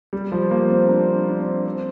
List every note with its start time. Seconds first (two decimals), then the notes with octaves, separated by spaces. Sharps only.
0.13 G3
0.32 F3
0.51 A#3
0.70 C4
0.89 D4
1.29 D4
1.40 C4
1.65 C4